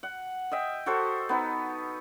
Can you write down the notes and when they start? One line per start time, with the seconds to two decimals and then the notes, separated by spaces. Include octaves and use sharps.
0.03 F#5
0.51 D#5 E5 G5
0.86 F#4 A4 C5
1.29 B3 D#4